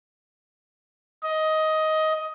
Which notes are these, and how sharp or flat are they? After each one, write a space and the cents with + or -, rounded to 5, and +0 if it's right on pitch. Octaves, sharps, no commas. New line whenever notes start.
D#5 +15